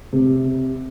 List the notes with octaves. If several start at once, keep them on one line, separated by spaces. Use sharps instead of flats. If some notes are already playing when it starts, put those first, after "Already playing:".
C3